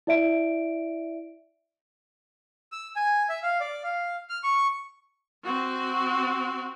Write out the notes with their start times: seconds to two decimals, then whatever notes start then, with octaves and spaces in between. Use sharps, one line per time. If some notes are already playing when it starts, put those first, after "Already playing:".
0.07 E4 D5 E5 D7
2.72 E6
2.96 G#5
3.29 E5
3.43 F5
3.61 D5
3.84 F5
4.29 F6
4.44 C#6
5.44 C4 F#4